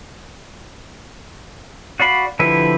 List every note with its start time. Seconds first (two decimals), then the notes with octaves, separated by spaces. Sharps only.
2.00 F#4 D5 F5 B5
2.39 D3 F3 E4 G4 B4